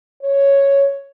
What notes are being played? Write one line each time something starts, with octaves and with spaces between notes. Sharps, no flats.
C#5